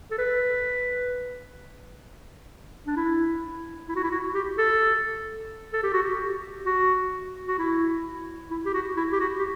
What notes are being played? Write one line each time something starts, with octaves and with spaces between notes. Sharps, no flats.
A4
B4
D4
E4
E4
F#4
E4
F#4
G4
A4
A4
G4
F#4
G4
F#4
F#4
E4
E4
G4
F#4
E4
G4
F#4
G4